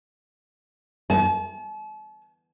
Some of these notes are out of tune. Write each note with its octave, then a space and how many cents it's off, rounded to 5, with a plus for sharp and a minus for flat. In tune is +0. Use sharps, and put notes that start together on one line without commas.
A5 -40